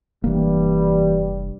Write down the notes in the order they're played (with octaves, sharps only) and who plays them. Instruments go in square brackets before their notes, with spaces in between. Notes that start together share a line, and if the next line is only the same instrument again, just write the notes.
[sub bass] F1 [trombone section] G2 G3 [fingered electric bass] E3 A#3